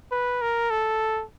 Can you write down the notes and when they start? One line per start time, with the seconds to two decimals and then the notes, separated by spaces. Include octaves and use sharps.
0.12 B4
0.42 A#4
0.70 A4